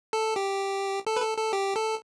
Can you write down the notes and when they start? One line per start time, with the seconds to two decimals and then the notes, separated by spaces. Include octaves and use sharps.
0.13 A4
0.36 G4
1.07 A4
1.17 B4
1.22 A4
1.38 A4
1.53 G4
1.76 A4